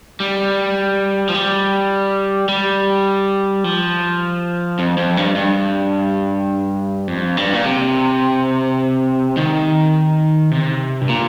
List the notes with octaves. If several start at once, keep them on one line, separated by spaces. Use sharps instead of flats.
G3
F3
G3
G3
F3
F2
F2
G2
G2
F2
G2
A#2
C3
D#3
C3
G2
A#2